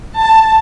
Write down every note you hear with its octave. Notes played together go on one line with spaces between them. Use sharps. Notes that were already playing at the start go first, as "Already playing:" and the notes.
A5